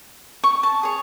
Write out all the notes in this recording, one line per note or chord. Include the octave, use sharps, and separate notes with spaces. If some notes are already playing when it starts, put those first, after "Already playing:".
C#6
A5
G#4 C#5